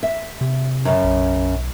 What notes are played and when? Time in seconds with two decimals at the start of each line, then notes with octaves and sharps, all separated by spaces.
0.03 E5
0.41 C3
0.85 F#2 C#3 C#4
1.04 B1